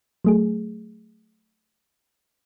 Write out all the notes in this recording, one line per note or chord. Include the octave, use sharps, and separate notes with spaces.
F#3 A3 G#4